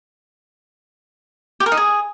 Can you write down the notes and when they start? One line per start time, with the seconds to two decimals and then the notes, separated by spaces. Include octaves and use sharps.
1.60 G4
1.66 A#4
1.72 D#4
1.77 G#4